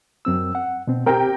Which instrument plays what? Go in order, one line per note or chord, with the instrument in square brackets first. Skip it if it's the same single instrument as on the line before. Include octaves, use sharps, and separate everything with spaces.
[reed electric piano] F#2 C4 E6
F#5
B2 C4
[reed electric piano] C4 G4 [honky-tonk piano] A#4 G5